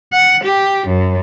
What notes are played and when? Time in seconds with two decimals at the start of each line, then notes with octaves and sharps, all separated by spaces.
0.13 F#5
0.44 G4
0.87 F#2